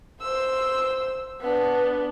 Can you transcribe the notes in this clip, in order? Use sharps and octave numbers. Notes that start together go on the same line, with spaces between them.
C5 E6
B3 D4